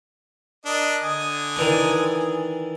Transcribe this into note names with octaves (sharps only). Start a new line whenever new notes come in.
D4 A#4 D#5
D3 G#5 D#6
D#3 E3 D4